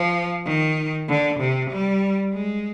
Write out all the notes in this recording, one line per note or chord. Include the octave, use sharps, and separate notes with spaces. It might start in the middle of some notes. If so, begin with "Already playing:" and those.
Already playing: F3
D#3
D3
C3
G3
G#3